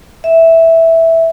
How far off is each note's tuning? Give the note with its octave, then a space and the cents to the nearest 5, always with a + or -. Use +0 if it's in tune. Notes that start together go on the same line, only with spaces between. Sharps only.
E5 -5